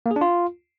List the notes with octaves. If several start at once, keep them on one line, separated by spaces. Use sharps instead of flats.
A#3
G#4
D4
F4